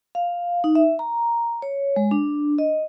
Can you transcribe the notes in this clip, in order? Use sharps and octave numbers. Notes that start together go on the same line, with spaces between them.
F5
D#4
E5
A#5
C#5
G#3
D4
D#5